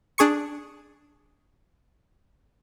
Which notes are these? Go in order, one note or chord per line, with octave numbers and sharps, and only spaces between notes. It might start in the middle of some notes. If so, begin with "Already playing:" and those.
D4 G#4 C#6 C#7